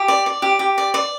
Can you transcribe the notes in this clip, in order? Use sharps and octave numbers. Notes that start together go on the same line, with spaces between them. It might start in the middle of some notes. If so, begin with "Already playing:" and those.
Already playing: G4
D5
D5
G4
G4
D5
D5